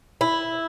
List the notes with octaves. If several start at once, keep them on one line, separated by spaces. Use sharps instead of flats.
E4